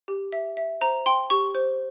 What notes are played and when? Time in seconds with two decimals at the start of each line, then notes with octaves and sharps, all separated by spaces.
0.08 G4
0.32 E5
0.57 E5
0.81 C5 A#5
1.06 G5 C6
1.30 G4 C#6
1.55 C5